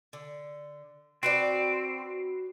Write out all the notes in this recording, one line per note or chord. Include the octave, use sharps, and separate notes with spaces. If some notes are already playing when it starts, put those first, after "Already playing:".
D3
C4 F#4 B4 D5